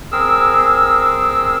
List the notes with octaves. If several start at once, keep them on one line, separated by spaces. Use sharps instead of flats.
C4 G#4 A#4 E6